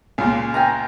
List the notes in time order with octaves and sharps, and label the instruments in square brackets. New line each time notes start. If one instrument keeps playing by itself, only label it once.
[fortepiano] C#2 A#2
[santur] G5 G#5 A#5